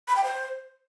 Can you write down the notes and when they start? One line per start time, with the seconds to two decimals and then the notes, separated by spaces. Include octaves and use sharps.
0.08 B5
0.16 G5
0.24 C5